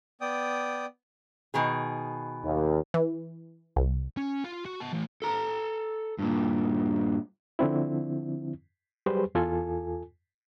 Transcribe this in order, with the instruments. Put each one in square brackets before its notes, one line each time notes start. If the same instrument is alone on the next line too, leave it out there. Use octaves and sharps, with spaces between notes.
[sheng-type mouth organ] B3 D5 G5 D#6
[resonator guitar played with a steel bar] B2 D#3 G#4
[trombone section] D#2
[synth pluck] E3
C2
[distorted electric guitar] C#4
F4
F#4
B3 A5
E3 A3
[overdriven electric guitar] A4 A#5
G2 A#2
[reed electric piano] D3 F3 C4 E4
F#3 G3 G4 G#4 B4 C5
E2 F4 A4 G#5